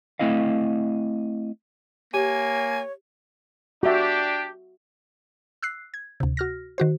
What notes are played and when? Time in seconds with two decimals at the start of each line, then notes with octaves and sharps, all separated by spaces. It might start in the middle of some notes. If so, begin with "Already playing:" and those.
0.19 A3 C4 E4 D#5 F5
2.14 A#3 G4 C#5 G#5
3.83 D4 F#4 G4 E5
5.63 E6 F#6 C7
5.94 G#6
6.20 D2 C3
6.37 F#4 F6 A#6
6.78 D#3 F#4 C5